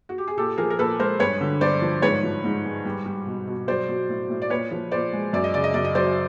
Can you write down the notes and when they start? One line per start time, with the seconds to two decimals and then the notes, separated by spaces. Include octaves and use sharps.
0.09 F#4
0.18 G4
0.27 G#4
0.37 A#2 G4 A4
0.58 F3 G#4 A#4
0.70 A#4
0.79 A#2 A4 B4
0.99 G#3 A#4 C5
1.20 G2 B4 C#5
1.41 D3
1.61 G2 C5 D5
1.82 F3
2.02 G#2 B4 C#5
2.23 F3
2.44 G#2
2.65 G#3
2.85 G3
3.06 G3
3.26 B2
3.47 B2
3.68 F#3 C5 D5
3.89 F#3
4.09 A2
4.30 A2
4.42 D5
4.50 A#2 B4 C#5
4.71 F3
4.91 A#2 C5 D5
5.13 G#3
5.33 F#2 D5
5.44 D#5
5.54 C#3 D5
5.64 D#5
5.74 F#2 D5
5.85 D#5
5.95 F#3 C5 D5